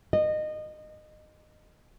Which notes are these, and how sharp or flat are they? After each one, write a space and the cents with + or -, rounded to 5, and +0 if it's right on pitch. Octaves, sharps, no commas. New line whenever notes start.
D#5 -20